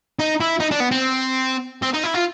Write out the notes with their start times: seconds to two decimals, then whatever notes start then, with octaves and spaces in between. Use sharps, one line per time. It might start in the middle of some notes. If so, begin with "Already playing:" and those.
0.19 D#4
0.40 E4
0.60 D#4
0.71 D4
0.80 B3
0.91 C4
1.82 C4
1.94 D#4
2.03 E4
2.14 F4